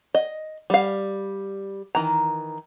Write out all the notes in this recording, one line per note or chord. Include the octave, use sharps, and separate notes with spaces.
D#5
G3 F5
D#3 E3 A#5